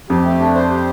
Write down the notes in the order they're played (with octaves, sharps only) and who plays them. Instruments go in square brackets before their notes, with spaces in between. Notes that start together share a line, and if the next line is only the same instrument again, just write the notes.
[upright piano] F2 [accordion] G4
[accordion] A3
D4
C5
G4